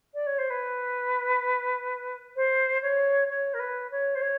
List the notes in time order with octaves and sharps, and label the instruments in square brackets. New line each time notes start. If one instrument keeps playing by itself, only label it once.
[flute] D5
C#5
C5
B4
C5
C#5
C#5
A#4
B4
C#5
C5
C#5